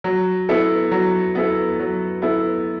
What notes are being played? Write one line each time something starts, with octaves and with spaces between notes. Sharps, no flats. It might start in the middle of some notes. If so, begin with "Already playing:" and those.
F#3
B3 E4 A4
F#3
B3 E4 A4
F#3
B3 E4 A4